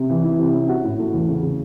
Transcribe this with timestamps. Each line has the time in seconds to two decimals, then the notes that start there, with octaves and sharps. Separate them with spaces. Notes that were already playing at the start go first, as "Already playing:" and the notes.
Already playing: C3
0.10 E3
0.24 E4
0.39 C3
0.54 C#4
0.69 F#4
0.84 A2
0.99 A3
1.13 E2
1.28 C#3
1.43 C#3